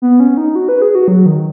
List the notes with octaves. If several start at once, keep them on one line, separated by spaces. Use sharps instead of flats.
B3
C#4
D#4
F#4
B4
G#4
F#4
F#3
D#3